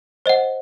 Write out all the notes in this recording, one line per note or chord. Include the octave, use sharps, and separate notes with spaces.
C5 D#5 F#5